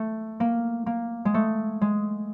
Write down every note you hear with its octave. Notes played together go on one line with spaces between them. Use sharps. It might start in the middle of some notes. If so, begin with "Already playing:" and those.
Already playing: A3
A#3
A#3
G#3
A3
G#3